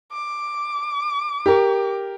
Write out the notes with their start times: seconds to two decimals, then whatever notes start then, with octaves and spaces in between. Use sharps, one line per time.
0.12 D6
1.46 G4 A#4